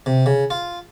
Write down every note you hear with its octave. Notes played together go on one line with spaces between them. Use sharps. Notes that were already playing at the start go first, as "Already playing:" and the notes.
C3
C#3
F4